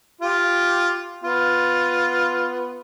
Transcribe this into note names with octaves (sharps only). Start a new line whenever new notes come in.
F4 G4
B3 F4